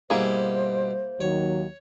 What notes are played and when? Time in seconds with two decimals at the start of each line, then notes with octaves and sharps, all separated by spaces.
0.10 G2 B2 A#3 E4 G#4 C5
1.21 D#2 D#3 F#3 C#5